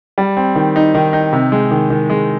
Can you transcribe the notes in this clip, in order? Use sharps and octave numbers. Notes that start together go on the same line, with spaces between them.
G3
C4
D#3
D#4
D#3
D#4
C3
G#3
D#3
D#3
G#3